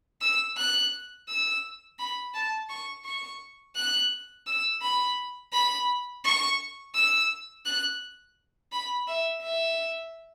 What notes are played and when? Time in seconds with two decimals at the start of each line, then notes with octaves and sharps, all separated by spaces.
0.21 E6
0.58 F#6
1.28 E6
1.99 B5
2.34 A5
2.70 C#6
3.05 C#6
3.76 F#6
4.47 E6
4.82 B5
5.53 B5
6.25 C#6
6.95 E6
7.66 F#6
8.72 B5
9.08 E5
9.43 E5